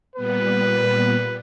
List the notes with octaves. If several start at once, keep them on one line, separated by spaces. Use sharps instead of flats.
A#2 G3 B3 B4